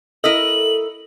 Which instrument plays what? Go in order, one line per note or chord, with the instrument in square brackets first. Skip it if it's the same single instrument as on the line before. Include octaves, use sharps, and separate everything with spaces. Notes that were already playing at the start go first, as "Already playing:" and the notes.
[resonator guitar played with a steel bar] E4 A#4 D#5 [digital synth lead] A4 [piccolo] F#7